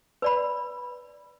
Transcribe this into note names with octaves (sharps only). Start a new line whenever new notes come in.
B4 D5 B5